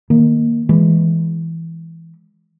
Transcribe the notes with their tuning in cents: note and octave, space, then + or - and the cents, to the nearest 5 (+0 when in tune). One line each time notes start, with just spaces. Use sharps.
D#3 +0 A#3 +0
E3 +0 G#3 +0